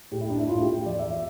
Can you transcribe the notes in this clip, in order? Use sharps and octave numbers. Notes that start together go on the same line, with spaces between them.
A2 G4
E4
A2 D4
E4
A2 F4
G4
A2
E2 D5
E5
E5